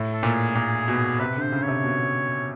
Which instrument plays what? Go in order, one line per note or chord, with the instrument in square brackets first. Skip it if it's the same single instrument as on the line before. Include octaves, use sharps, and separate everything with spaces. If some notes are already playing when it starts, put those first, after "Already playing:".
Already playing: [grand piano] A2
[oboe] A4
[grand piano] A#2
[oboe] G#4
[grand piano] A#2
B2
[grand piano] C3 [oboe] B4
[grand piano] D3
[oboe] C5
[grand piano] C#3
[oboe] C#5
[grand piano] C3
B2